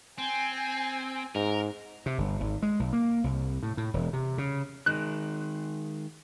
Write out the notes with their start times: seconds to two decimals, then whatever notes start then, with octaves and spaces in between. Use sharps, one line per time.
0.18 C4 G#5
1.35 G#2 A#4
2.06 C3
2.18 G1
2.41 G#1
2.62 G#3
2.79 B1
2.93 A#3
3.24 C2
3.63 A2
3.77 A2
3.94 E1
4.13 C3
4.38 C#3
4.86 D#3 G#3 F#6